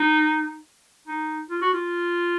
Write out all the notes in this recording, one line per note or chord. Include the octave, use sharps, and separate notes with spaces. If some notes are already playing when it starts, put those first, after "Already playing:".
Already playing: D#4
D#4
F4
F#4
F4